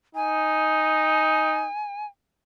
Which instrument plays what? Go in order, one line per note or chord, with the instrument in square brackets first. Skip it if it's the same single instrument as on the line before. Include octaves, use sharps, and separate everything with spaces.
[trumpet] D#4 [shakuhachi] G#5